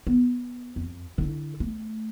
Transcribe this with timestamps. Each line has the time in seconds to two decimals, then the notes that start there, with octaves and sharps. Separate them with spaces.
0.07 B3
0.76 F2
1.18 D3 E4
1.60 A3